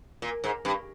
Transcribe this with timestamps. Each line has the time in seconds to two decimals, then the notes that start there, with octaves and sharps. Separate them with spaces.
0.22 A#2
0.44 G#2
0.65 G2